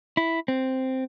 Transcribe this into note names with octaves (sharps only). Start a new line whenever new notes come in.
E4
C4